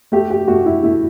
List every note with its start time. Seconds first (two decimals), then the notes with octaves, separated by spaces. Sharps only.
0.12 A3 G4
0.30 G4
0.48 A3 F#4
0.66 E4
0.83 A3 E4